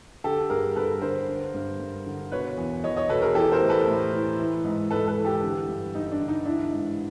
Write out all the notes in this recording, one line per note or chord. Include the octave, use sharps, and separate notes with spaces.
D3 G4 A4
G2 G#4 A#4
G2 A4 B4
D3 A#4 C5
D3
G2
G2
D3
B2 B4 C#5
E2
E2 C#5 D#5
C#5 D#5
B2 A4 B4
G#4 A#4
E3 G4 A4
A#4 C5
A2
A4 B4
A2
E3
E3
G#2
G#2 A4 B4
A4 B4
E3
G4 A4
D3
G2
G2 D#4
D4
D3
D#4
E3 D4 E4
G#2